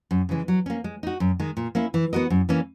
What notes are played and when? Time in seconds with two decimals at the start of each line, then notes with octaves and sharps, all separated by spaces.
0.11 F#2
0.29 C#3 E3 G#3
0.48 F#3
0.66 A#3 C#4
0.84 G#3
1.03 D#4 F#4
1.20 F#2
1.40 D#3 G#3
1.57 A#2
1.75 A#3 C#4 E4
1.94 E3
2.13 B3 F#4 A#4 D#5
2.30 F#2
2.49 E3 A#3 C#4